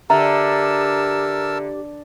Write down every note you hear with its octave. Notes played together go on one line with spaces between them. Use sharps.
D3 G4 A#4 E5 A5 A#5 E6